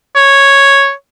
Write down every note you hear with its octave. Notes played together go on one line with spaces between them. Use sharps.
C#5